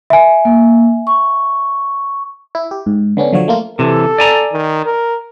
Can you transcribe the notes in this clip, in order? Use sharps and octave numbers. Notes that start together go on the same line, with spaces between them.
E5 G#5
A#3
C#6
E4
G4
G#2
D3 B3 C#4 D4
D3 F3 F#3 C#5
A3 A#3 F4
C3 E3 A4
D5 G#5 A#5
D#3
A#4